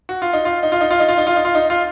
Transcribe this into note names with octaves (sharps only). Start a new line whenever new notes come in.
F#4
F4
D#4
F4
D#4
F4
D#4
F4
D#4
F4
D#4
F4
D#4
F4
D#4
F4